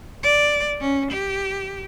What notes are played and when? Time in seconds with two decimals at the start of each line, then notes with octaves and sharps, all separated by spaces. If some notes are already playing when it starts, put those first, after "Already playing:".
0.23 D5
0.81 C#4
1.11 G4